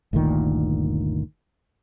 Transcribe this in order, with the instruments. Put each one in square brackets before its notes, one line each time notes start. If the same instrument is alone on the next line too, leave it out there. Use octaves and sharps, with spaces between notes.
[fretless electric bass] G1 D2 A#2 D#3